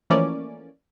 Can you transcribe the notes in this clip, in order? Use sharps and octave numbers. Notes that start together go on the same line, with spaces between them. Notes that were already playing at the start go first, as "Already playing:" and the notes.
E3 F3 A3 A#3 C#4 D5